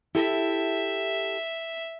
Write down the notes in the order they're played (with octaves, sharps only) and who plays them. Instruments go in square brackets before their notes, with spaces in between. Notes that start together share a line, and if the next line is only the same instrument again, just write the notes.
[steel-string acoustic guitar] E4 G4 A4 [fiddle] E5